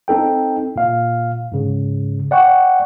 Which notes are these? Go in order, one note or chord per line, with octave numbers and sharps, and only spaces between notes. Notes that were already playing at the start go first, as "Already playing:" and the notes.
C4 D#4 A4 G5
A#2 F5
G#2 C#3
D5 F#5 G5 C#6